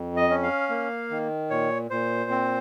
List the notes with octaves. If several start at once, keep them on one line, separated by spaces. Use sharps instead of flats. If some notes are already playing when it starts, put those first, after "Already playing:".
Already playing: F2
D#5
C#4
F5
A#3
D#3
A#2 C#5
A#2 C5
C4